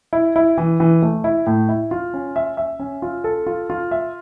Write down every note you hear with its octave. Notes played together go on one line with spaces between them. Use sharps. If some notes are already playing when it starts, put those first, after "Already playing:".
E4
E4
E3
E3
A3
E4
A2
E4
F4
C#4
E5
E5
C#4
F4
A4
F4
F4
E5